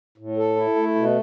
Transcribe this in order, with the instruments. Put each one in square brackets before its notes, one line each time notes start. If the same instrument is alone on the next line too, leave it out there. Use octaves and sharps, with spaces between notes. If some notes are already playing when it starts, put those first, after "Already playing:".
[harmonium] A2
A4
E4
A3
B2